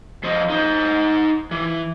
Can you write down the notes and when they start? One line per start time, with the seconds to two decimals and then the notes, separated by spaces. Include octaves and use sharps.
0.24 F3 C5 D#5
0.50 D#4 C5
1.51 E3